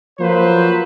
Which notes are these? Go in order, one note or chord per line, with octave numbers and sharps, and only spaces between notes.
F3 F#3 A#3 B4 C5